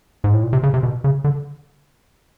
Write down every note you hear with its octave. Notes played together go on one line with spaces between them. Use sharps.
G#2
A2
A#2
C3
C#3
C3
B2
C#3
D3